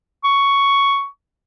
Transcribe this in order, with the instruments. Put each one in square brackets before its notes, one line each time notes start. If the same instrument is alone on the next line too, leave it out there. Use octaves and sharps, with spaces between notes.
[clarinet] C#6